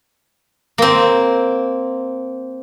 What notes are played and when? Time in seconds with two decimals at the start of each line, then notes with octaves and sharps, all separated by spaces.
0.78 A#3 C4